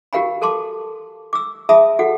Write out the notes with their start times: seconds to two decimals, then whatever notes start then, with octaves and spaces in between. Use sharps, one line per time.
0.13 F#4 G4 A#4 F5 G#5 B5
0.41 A4 A#4 A5 C6 D6
1.33 D6 E6
1.69 G#4 E5 A5 B5 D#6
1.99 F#4 A4 F#5